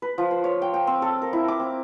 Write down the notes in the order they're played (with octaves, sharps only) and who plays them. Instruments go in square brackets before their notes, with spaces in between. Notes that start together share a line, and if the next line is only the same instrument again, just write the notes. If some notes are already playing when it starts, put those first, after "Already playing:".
[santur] B4
F3
C5
C#5
G5
G5
C4
A4
A#4
E4
D6
C4